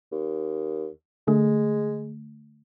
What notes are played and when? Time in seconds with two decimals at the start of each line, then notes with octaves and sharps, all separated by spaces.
0.12 D#2
1.28 D3 G#3 A3